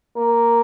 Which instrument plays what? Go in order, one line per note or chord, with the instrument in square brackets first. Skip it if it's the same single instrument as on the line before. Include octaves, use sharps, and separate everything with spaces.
[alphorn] A#3